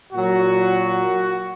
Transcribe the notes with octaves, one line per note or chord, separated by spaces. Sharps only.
A#2 F#3 F#4